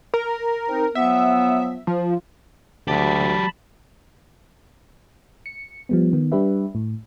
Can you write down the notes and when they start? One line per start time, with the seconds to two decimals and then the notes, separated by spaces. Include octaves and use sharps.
0.14 A#4
0.68 C4 D#4
0.95 F3 F#3 B3 E5
1.87 F3
2.88 D2 F#3 G4 A5 B5
5.46 C#7
5.89 F3 G3 B3
6.13 D#3 B3
6.32 G3 D4 G4 B4 E5
6.75 A2